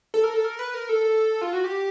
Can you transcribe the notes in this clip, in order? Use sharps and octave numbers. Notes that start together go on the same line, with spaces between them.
A4
A#4
A4
A#4
B4
A#4
A4
F4
F#4
G4